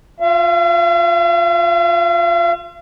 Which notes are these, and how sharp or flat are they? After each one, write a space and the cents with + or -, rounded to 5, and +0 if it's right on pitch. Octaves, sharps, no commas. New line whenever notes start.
F4 +10 F5 -45